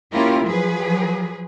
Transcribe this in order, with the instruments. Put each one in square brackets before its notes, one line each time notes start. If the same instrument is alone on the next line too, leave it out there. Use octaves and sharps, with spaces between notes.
[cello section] A#3 C#4 E4 F4 G4 A#4
F3 F#3 G#4 B4